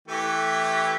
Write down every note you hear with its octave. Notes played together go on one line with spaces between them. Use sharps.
E3 A3 G4